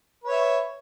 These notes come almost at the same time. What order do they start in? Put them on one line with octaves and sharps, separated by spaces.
B4 C#5 E5